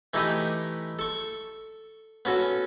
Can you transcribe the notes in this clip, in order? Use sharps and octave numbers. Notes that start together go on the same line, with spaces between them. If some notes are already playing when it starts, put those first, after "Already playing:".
E3 A3 D#4 E4 G4 D#6
A4 C#6
B3 C#4 F#4 A4